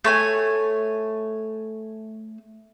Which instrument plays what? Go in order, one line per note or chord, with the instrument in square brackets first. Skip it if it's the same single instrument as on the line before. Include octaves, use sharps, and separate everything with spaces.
[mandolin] A3 C#5 G#5